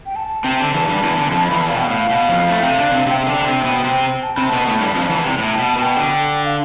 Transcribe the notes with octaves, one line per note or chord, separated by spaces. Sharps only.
G5
A5
C3 C4
D3
E2 E3
G2 G3
E2 E3
D3
F2 F3 A5
E2 E3 B5
A5
B2 F5
G5
A2 F5
B2
F2 F3
A2 A3
C3 C4
D3 D4
C3 C4
C3 C4 G5
D3 D4
C3 C4
B2 B3
C3 C4
A5
C3 C4 B5
A5
B2 B3
A2 A3
G2 G3
F2 F3
E2 E3
C3
A2
A5
B2
A5
B2 G5
D3
F5